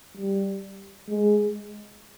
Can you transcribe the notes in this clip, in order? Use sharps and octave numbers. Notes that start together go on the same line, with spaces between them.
G3
G#3